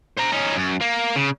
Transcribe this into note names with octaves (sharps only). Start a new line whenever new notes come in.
C5 A#5
C#4 D#4
F#2
A#3
C#3